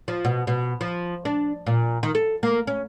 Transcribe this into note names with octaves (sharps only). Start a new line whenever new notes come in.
F3
B2
B2
F3
D4
A#2
D#3
A4
A#3
C#4